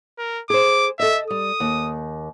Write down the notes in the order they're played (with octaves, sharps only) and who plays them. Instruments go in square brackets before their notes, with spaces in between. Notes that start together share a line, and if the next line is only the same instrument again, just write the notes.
[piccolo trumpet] A#4
[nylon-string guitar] G#4 C5 [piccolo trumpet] D6
[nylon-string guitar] A4 D#5 [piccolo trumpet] E5
[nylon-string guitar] G3 [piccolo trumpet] D#6
[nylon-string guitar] D#2